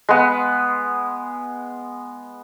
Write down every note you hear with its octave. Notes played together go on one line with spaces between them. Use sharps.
G#3 B3